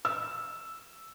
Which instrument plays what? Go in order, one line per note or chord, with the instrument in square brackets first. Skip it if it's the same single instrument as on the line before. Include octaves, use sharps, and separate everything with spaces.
[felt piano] E6